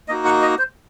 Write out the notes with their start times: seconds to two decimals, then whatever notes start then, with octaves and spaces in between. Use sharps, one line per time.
0.08 A#3 D#4 F#4 D#5
0.25 F#5
0.42 D#5
0.58 C5